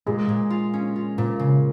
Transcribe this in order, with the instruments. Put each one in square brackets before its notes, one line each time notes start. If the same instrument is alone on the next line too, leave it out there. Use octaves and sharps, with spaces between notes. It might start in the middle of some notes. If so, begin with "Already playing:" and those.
[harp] A#2 [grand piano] G#3
[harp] A#2
F4
C#4
F4
A#2
C#3